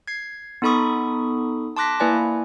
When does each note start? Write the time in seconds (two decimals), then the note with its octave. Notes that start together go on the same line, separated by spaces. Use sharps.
0.08 G#6 C7
0.62 B3 D#4 A4 B5 C#6 D#6
1.77 A5 C6 D6 F#6 A#6 B6
2.00 A#3 E4 B4 D5 G#5